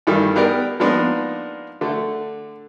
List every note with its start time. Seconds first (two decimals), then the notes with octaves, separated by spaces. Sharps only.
0.07 G2 D#3 E3 G3 A3
0.36 B3 G4 G#4 A#4 B4 D5
0.80 F3 G#3 A#3 B3 D4 D#4
1.81 D3 A3